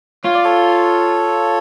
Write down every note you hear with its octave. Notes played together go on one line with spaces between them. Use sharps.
F4 C#5
D5
A4 C#5